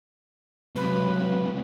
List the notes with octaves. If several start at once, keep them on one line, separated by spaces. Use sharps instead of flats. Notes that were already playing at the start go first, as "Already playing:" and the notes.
C#2 C3 F#3 B4